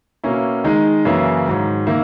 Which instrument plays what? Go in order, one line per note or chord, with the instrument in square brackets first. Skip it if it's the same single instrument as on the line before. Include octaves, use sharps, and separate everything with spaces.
[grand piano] B2 A#3 C#4 E4
D#3 G#3 D#4
F#2 C#3 E3 A#3 E4
G#2 D#3 F#3
D#3 A#3 E4